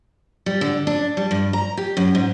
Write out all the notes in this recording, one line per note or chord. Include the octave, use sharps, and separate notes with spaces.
G3
D3
D4
G3
G2
A#5
G4
F#2
G#2